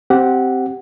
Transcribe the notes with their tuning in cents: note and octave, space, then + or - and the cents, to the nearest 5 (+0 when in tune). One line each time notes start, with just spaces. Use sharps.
C4 +0 G4 -15 F#5 +0